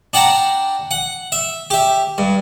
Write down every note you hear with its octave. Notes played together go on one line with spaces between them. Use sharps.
D4 F#5 G5 A5 A#5
F#5
E5
G4 E5
G2